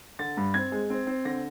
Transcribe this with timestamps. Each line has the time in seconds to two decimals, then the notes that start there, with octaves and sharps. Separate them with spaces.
0.19 D3 A6
0.37 G2
0.54 C4 G#6
0.72 G#3
0.90 C4
1.07 C4
1.25 D3 A#6